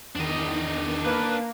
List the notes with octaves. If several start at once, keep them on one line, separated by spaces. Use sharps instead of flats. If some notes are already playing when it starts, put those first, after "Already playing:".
E2 D#3 D4 D#5
A#3 B4